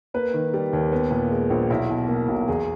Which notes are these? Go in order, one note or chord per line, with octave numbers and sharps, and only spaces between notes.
A#3 B4
D#3
G3
D#2
B3
A#2
G#3
A#1
B1 E4
B2
A#3
B1
E2 G#4